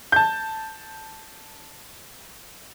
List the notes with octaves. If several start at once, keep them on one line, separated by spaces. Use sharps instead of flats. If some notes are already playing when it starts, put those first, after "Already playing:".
A5 G6